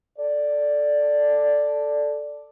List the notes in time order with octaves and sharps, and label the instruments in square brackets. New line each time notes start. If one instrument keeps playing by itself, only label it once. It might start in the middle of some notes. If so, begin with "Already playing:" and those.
[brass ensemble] A4 D5